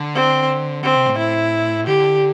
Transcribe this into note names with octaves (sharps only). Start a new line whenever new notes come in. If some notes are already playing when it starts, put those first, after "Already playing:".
Already playing: D3
C4
D3 C4
C3
A2
E4
D3 G4